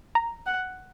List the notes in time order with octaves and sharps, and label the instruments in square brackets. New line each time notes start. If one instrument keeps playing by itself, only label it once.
[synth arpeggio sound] A#5
[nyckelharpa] F#5